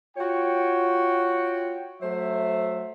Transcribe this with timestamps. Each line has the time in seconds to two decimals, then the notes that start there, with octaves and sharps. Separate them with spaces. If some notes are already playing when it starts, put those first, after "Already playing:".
0.17 F4 F#4 C#5 G5
2.02 F#3 A3 C5 E5